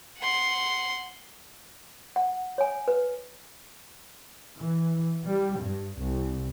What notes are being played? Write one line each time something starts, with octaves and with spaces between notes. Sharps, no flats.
F#5 C6
F#5
C#5 G#5
B4
E3
G3
G2
C2